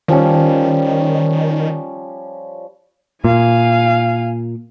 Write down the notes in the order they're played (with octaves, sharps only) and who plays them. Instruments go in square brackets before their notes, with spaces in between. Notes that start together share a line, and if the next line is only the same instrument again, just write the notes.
[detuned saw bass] D#3 [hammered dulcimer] F3 G3 C#4
[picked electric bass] A#2 [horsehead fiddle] F5 G#5